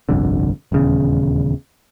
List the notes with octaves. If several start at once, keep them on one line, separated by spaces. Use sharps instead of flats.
G1 C2 F2 D3
D#1 E2 C#3